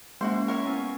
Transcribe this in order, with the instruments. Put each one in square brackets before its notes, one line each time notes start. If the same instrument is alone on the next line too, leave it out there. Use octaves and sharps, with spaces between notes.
[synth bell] G#3 [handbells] A#3 [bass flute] C#4 [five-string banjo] E4 F#4 C5
[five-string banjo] A#4 C#5 E5 [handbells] C#6
[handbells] B3 E4 G#5